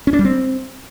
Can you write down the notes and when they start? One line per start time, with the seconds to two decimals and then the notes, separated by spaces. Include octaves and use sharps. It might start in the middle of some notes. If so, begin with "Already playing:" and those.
0.07 C#4
0.13 D4
0.19 G3
0.25 C4